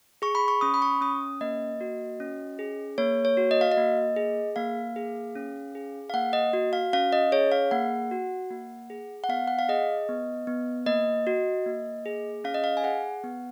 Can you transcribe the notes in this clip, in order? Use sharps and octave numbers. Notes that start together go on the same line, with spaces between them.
G#4 C#6
B5
C#6
C#4 D#6
B5
C#6
C#4 D#6
A#3 D#5
F#4
C#4
G#4
A#3 C#5
C#5
F#4
D#5
F5
D#5
A#3
G#4
A#3 F5
G#4
C#4
G#4
F5
A#3 F#5
D#5
F#4
F5
C#4 F5
D#5
G#4 C#5
F5
A#3 F#5
F#4
A#3
G#4
F#5
B3 F5
F#5
F5
G#4 D#5
B3
B3
A#3 D#5
F#4
A#3
G#4
C#4 F5
D#5
F5
G#5
G#4 F#5
B3